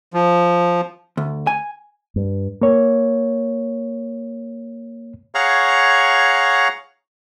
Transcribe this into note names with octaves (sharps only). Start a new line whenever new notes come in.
F3
D2
G#5
G2
A#3 C#5
G#4 C#5 F5 F#5 A#5 C#6